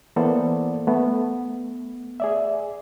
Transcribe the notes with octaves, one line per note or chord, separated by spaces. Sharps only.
E3 A#3 B3 A4 C5 D5
A3 B3
G#4 D5 E5